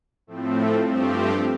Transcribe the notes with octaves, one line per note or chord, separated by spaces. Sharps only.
A2 F3 A3 C4
G2 F3 A3 C4 G4